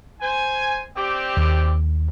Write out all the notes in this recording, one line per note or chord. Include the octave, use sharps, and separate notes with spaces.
C5 G#5
C4 G4 D5
D#2